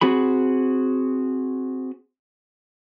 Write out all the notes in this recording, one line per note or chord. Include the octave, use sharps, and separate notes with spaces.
C4 F#4 G#4 B5